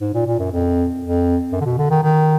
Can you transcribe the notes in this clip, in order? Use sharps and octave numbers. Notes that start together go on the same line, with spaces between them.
G#2
A#2
A#2
F#2
F2
F2
F#2
D3
B2
D3
D#3
D#3